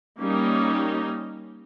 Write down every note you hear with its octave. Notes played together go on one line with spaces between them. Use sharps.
G3 A#3 C#4 D#4